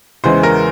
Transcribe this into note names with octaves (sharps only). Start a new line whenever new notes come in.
E2 C#3 E3 G#3 C5
A#4